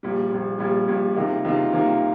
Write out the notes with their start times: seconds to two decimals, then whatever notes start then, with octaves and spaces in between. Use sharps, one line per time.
0.03 A#1 A#2 G3
0.32 A#1 A#2 G3
0.59 A#1 A#2 G3
0.87 A#1 A#2 G3
1.16 C#2 C3 D#3 A#3 F4
1.45 C#2 C3 D#3 A#3 F4
1.72 C#2 C3 D#3 A#3 F4